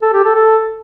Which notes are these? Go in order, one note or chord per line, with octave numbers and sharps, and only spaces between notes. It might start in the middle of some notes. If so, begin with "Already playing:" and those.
A4
G4
A4
A4